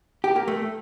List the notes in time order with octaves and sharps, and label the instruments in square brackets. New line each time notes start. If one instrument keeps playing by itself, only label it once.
[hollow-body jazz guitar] G4
A#3
A3